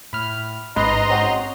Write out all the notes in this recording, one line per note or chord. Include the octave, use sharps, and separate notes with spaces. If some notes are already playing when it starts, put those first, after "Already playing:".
A2 B5 F6
A1 G#2 C#4 B4 D#5 A#5 C6
C4 C#4 F#4 G6